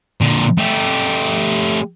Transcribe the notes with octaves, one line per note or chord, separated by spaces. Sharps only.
A#2 D3
A3 G4